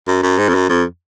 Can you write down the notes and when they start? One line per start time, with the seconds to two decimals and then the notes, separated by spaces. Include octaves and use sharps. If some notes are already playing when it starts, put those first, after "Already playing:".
0.07 F#2
0.23 F#2
0.38 G#2
0.49 F2
0.55 F#2
0.69 F2